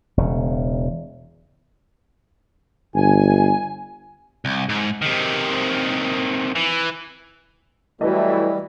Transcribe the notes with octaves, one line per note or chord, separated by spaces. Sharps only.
E1 C#3
G1 G#5
C2
G#2
C3 D#3
E3
E3 F#3 G3 A3 E4 F#4 B4 D#5